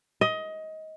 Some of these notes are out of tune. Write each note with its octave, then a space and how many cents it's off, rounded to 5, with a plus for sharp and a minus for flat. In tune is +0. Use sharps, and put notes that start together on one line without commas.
D#5 +20